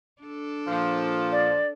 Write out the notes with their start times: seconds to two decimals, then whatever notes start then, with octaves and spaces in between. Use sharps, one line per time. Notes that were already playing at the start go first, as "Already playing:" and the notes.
0.22 D4 A4
0.67 A#2 F3
1.32 D5